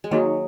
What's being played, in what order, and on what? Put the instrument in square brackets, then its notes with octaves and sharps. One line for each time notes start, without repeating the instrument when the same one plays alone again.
[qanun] G#3
[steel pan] D#3 A#3 D#4 G#4 [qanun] F#3